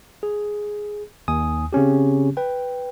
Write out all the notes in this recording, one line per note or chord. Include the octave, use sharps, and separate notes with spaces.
G#4
D#2 G#5 D#6
C#3 C4 C#4 G4
B4 G5